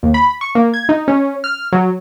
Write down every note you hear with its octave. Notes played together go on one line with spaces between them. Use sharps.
D#2
B5
C#6
A#3
G#6
D#4
C#4
F6
F#3